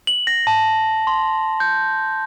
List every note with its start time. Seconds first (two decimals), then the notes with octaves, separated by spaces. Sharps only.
0.07 F#7
0.27 A#6
0.47 A5
1.07 C6
1.60 G6